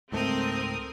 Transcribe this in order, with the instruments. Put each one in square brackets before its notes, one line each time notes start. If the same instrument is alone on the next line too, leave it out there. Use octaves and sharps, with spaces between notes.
[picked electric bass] C#2 G#2 A3 [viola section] C4 [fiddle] A#4 D#6